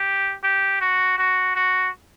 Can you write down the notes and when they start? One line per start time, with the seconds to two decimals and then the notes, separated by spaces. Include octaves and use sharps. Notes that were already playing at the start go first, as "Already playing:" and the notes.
Already playing: G4
0.43 G4
0.81 F#4
1.18 F#4
1.55 F#4